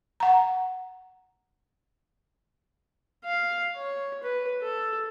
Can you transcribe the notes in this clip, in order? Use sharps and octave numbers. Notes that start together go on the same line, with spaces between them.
F#5 A#5
F5
C#5
B4
A4